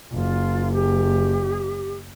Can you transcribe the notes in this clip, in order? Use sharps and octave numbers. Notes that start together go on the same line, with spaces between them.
F#1 F4
G4